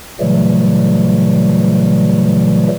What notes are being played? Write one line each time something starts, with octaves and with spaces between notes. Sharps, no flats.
A#2 C#3 E3 F#3 G3 A3